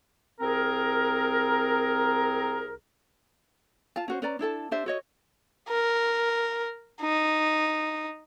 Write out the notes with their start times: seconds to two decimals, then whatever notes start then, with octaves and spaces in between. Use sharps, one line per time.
0.40 C2 C4 G#4 A#4
3.96 F4 F5 A5
4.08 C#4 F#4 C5
4.22 C#4 B4 D5 A#5
4.39 D4 E4 A4 A5
4.71 D4 G4 C5 E5
4.86 F#4 C#5 D#5
5.69 A#4
7.02 D#4